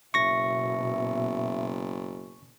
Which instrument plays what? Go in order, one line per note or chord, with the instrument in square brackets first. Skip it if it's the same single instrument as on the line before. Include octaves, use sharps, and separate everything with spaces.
[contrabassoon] F#1 [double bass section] B2 [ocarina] E5 [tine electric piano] C#6 A#6